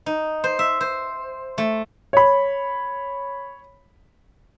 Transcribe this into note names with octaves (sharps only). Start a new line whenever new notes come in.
D#4
C5
E5
C5
A3
C#5 B5